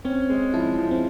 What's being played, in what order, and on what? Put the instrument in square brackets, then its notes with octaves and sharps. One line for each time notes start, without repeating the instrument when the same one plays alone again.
[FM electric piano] C4 [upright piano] C#4
[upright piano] G#3
[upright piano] F3 [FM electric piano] E4
[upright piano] F3
[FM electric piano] C4